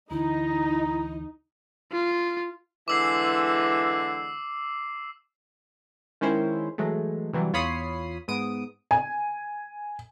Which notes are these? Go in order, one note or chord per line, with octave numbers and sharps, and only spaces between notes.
D2 D3 E3 D#4 E4 A#5
F4
D3 E3 G#3 D6 E6 C7
D#3 G#3 C#4 E4 C5
E3 F#3 G#3 A3
C3 E3 F#3 G3
E2 F4 C#5 B5 D#6 C7
G#2 B3 D#6 D7
G#5